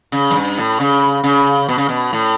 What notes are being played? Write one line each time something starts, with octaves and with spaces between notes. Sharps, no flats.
C#3
F#2
G2
A2
C#3
C#3
B2
C#3
B2
A2